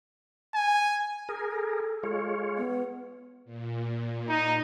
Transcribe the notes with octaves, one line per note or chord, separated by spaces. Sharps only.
G#5
G#4 A#4
A4
G#3 F4 C#5
B3
A#2
D#4